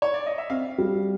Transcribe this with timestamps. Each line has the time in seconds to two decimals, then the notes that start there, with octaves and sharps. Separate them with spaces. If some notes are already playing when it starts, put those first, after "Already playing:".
0.02 C#5
0.14 D5
0.26 D#5
0.38 E5
0.50 C4 F5
0.78 G3